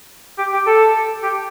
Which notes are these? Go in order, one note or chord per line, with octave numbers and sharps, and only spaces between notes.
G4
G4
A4
G4